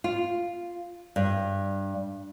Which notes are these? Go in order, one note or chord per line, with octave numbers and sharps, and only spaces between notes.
F4
G2